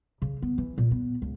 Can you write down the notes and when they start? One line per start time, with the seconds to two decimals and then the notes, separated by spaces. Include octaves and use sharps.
0.22 C#3
0.42 B3
0.58 E3
0.78 A#2
0.91 B3
1.22 C#2